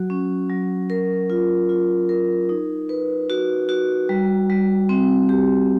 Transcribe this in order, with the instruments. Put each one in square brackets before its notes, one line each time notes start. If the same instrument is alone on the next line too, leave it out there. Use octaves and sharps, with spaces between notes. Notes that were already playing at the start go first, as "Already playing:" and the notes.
Already playing: [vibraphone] F#3 F#4
C#4
F#3
A#4
F4
F4
A#4
D#4
B4
F#4
F#4
G3
G3
C4
G4